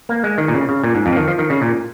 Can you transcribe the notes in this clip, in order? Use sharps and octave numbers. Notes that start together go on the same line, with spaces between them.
A#3
G#3
D#3
A#2
C#3
C#3
A#2
G#2
F2
F3
D#3
F3
D#3
C#3
A#2